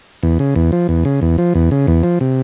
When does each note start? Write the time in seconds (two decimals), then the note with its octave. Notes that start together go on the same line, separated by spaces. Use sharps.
0.23 E2
0.39 C#3
0.56 E2
0.72 F3
0.89 E2
1.05 C#3
1.22 E2
1.38 F3
1.55 E2
1.71 C#3
1.87 E2
2.03 F3
2.21 C3